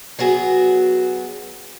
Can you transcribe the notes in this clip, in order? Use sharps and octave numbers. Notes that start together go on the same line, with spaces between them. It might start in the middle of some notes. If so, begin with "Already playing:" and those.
F#3 B3 F#4 G#4